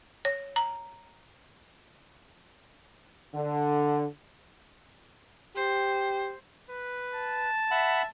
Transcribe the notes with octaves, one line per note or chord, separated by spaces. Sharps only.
C#5
A#5
D3
G4 C5
B4
A5
E5 F#5 B5